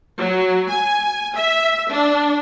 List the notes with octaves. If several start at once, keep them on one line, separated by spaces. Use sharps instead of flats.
F#3
G#5
E5
D4